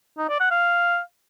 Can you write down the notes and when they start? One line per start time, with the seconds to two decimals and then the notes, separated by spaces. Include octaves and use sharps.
0.18 D#4
0.29 D5
0.40 F#5
0.51 F5